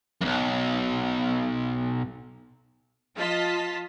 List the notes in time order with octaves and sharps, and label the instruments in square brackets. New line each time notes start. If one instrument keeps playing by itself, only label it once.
[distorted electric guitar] B1 F#2
[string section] F3 F4 D#5 A5 B6